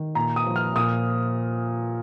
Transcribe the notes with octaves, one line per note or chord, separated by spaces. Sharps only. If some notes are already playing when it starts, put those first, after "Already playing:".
Already playing: D#3
A#2 A#5
D#6
F3
F6
A#2 D#6